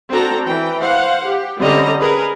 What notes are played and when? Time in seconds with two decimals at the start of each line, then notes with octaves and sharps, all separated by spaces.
0.10 C4 D4 F#4 A4 A#5
0.45 E3 G5
0.80 C5 F5 F#5
1.24 G4
1.59 D3 G3 C4 C#4 D#5 A#5
1.99 G#4 A#4 B4